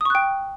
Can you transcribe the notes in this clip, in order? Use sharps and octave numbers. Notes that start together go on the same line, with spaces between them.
G5 C#6 D#6 F#6